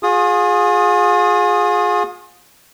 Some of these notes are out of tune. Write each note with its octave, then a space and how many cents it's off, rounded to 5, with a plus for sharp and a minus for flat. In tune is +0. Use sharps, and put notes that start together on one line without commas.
F4 +40 G#4 +0 D#6 -5